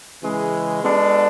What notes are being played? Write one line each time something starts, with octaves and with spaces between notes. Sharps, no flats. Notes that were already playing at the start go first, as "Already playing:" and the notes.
C#3 E3 G#3
G#3 B3 D4 F#4 A4